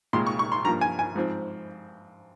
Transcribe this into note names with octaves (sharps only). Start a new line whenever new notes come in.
C2 A#2 G#3 C6
C#6
C#6
C6
G2 F3 A#3 A#5
G#5
G#5
G#2 F3 C4